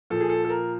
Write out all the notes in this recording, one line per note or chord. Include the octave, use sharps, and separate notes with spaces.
A#2 F3 A4
G#4
A4
A4
A#4